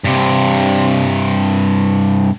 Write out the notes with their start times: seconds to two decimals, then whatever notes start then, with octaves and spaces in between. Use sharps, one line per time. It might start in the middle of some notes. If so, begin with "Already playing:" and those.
0.04 G2 C3